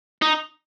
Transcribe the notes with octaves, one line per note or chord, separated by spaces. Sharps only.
D#4